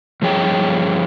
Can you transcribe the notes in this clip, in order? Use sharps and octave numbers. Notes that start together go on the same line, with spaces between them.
G2 F3 G#4 C#5 G5